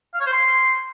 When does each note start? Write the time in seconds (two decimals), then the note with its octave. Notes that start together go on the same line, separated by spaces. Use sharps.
0.14 F5
0.20 C#5
0.26 C5
0.32 C6